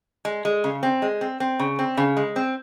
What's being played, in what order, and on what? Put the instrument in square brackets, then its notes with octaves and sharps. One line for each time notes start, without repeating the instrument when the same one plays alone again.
[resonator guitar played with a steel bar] G#3
G#3
C#3
C4
G#3
C4
C4
C#3
C4
C#3
G#3
C4